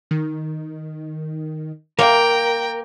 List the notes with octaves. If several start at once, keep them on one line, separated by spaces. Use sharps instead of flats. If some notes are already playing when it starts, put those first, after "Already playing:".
D#3
A#3 A#4 G5 A#5